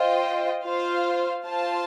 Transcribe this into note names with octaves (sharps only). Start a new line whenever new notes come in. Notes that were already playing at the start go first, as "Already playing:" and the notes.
Already playing: F4 C5 D#5 G5
F4 C5 F5
F4 C5 F5 A5